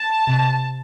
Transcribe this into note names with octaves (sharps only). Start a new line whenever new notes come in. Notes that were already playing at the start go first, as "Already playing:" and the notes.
Already playing: A5
C3